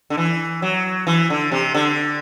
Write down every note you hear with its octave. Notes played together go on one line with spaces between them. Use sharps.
D3
E3
F#3
E3
D3
C3
D3